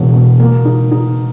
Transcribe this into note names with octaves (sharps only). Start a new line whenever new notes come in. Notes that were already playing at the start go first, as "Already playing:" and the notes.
Already playing: E1 B2
B2
A#3
D#4
D#4